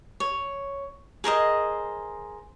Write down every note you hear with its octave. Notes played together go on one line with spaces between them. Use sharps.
C#5
G#4 A#4 C5 D#5